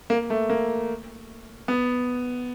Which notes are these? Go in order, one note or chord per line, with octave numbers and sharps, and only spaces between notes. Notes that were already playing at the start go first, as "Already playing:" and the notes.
A#3
A3
A#3
B3